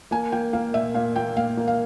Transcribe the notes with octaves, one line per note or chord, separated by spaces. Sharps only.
A#3 G#5
A#3 G5
A#3 F5
A#2 E5
A#2 F5
A#3 G5
A#2 F5
A#3
F5